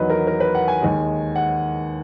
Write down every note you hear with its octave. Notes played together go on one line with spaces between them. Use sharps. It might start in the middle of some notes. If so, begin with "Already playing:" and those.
Already playing: E2 D#3 F#3 B4 D#5
A#4
A#4
B4
F#5
G#5
D#2 D#3 G#3
F#5